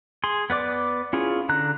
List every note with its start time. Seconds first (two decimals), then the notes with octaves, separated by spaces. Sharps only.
0.24 G#4 C6
0.50 B3 B4 D5 D6
1.13 C#4 E4 F4 G#4
1.49 D3 A#5 F#6